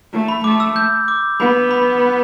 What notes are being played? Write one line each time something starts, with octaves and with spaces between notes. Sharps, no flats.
A3
B5
A3 D6
E6
G6
D6
B3 B5
B5